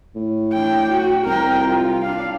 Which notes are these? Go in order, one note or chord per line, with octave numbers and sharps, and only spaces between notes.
A2
D4 G5
F#4
C2 A#4 G5
F4
D4 F5